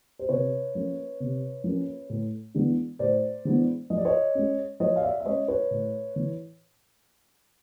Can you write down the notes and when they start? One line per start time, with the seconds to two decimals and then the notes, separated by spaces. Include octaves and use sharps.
0.19 C5
0.29 C3 B4 C#5
0.75 F3 A#3 C#4
1.20 C3
1.64 F3 A#3 C#4
2.10 A2
2.54 E3 G#3 B3 D4
2.99 A2 C5 D5
3.45 E3 G#3 B3 D4
3.90 F3 D#5
3.97 D5
4.05 C#5 D#5
4.35 G#3 C#4
4.80 F3 C#5 D#5
4.96 F5
5.03 D5 E5
5.20 E5
5.26 G#3 C#4 C#5 D#5
5.48 B4 C#5
5.71 A2
6.16 E3